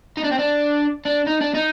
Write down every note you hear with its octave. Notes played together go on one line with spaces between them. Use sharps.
D#4
D4
C4
D4
D4
D#4
D4
D#4